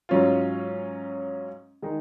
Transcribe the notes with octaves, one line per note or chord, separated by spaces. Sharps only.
G#2 F#3 C#4 F4
D#3 G#3 D#4